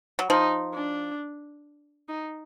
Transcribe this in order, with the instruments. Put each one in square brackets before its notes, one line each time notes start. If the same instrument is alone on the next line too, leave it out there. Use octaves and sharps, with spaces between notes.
[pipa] F#3
[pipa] F3 [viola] D#4
[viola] D4
D#4